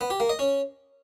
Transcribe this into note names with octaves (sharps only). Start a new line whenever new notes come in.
B3
G4
A#3
D#5
C#4